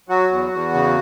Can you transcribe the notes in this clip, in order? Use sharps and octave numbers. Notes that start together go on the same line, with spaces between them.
F#3 F#4
E2
E2
C#3